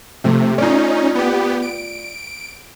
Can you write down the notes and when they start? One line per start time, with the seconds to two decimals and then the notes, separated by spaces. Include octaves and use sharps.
0.24 C3 F3 A3
0.58 C#4 D#4 F4 D5
1.15 B3 G4
1.62 D7